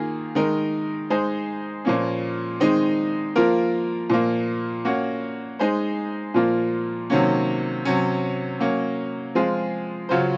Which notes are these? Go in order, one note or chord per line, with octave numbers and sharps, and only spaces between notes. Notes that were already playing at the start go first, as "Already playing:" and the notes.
Already playing: D#3 A#3 F4 G#4
D#3 G#3 D#4 A#4
G#3 D#4 G#4 C5
A#2 F3 A#3 C#4
D#3 G#3 C4 D#4
F3 A#3 F4 A#4
A#2 F3 A#3
A#3 C#4 F#4
G#3 D#4 G#4 C5
A#2 F3 A#3 F4
C3 D#3 F#3 A#3 C#4
C3 F#3 C#4
F#3 A#3 C#4
F3 G#3 C4 F4 G#4
C#3 F#3 C#4 F4 C5